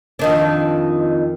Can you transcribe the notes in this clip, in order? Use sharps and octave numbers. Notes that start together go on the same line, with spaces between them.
F2 D#3 D4